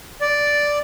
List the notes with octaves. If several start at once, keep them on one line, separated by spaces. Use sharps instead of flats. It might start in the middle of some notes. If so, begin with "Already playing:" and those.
D5